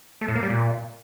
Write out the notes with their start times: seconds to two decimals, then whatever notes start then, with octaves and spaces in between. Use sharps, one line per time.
0.21 A3
0.28 A2
0.36 A#3
0.43 G3
0.50 A#2